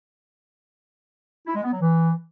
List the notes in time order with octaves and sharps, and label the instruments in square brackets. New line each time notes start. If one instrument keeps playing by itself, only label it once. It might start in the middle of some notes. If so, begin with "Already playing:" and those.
[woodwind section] E4
G#3
B3
F#3
E3